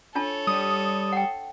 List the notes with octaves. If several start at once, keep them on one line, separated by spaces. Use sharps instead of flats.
D4 F4 A4 C#5 A5
G3 D#6
F#5 G5